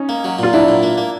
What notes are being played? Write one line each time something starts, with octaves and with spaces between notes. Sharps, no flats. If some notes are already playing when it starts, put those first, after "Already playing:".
Already playing: C#4 D#4
A#3
F#3
A#2 F4
F#3 D4 E4
A#2
A#3
A#3